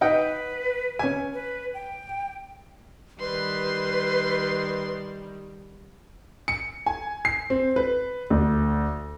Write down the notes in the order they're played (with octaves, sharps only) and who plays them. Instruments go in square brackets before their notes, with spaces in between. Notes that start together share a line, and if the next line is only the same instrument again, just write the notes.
[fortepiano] D#4 F#5 G5 [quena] B4
[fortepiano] C#4 G#5
[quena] B4
G5
[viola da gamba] D#3 G3 [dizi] B4 [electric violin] C6
[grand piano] C#7
G#5
C7
C4
B4
D2